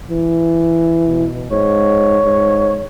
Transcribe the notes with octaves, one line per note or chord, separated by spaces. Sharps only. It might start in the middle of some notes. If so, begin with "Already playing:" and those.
E3
B2
G#2 C#5
G#2